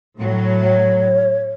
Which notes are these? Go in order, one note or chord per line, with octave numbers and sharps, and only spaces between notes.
A2 F#3
C#5